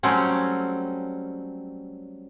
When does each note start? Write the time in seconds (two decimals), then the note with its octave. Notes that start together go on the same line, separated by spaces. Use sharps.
0.03 F#3 G3 A3 C4 C#4